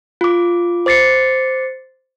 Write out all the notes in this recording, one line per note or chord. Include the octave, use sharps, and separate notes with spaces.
F4 D6
C5 D6 A6 C7 C#7